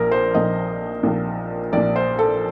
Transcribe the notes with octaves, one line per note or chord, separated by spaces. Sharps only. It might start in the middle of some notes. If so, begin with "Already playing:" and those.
Already playing: A#1 A#2 A#4
C5
A#1 A#2 D#5
A#1 A#2
A#1 A#2 D5
C5
A4